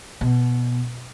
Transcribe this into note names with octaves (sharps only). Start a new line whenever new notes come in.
B2